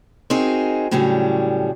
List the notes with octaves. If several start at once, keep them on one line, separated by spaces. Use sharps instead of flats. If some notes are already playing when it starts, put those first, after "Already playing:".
C4 D#4 F#4 G#4 A#4
A2 C#3 F#3 G3 D4